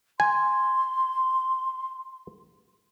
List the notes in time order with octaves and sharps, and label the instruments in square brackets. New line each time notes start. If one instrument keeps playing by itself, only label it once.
[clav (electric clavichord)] G#5 [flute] C6